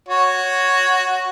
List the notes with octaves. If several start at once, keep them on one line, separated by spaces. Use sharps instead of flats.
F#4 C#5